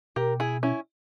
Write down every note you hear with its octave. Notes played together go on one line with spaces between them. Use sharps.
B2 G4 A#4
E4 G#4
C#4 E4